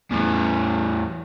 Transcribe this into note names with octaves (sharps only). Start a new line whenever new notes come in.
E2 A2